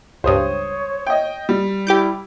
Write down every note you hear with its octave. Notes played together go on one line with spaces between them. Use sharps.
C#2 G2 C5 C#5 D#6
D#5 G5
G3
E4 G4 D6 G6